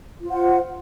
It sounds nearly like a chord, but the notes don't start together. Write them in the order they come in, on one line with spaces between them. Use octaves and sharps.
F4 C5 F#5